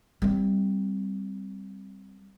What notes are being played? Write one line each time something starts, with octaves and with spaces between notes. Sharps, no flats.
G3 C4